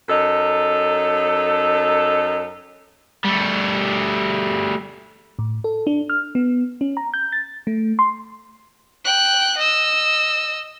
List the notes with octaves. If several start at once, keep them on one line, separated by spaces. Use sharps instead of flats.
F#2 D#4 A4
G3 A3
A2
A4
D4
F6
B3
C#4
A#5
G6
A6
A3
C6
G5 F#6
D#5 E6